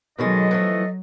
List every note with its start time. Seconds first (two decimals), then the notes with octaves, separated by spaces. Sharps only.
0.18 B2 D#3 F#3 G#3 A4 D#5
0.51 E3 F3 A3